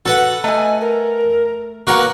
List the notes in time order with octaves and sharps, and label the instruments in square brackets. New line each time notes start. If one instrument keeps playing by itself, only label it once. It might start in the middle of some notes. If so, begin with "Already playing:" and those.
[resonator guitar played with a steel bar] F#4 [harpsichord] A4 B4 F#5
[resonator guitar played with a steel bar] A3 G#5 [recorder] D#5
[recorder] A#4
[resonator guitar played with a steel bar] A#3 F#5 [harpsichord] F#4 A#4 B4 [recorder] F#6